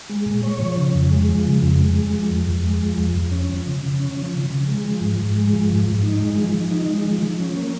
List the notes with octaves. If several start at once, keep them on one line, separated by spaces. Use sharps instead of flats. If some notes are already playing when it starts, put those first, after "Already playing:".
G#3
A#2
C#5
F3
C#3
F2
G#3
F3
C#3
F2
G#3
G#3
F3
F2
F2
G#3
F3
F2
F2
C#4
F3
C#3
C#3
C#4
F3
C#3
C#3
G#3
F3
G#2
G#2
G#3
F3
G#2
G#2
D#4
G#3
F3
F3
D#4
G#3
F3
F3
C#4
A#3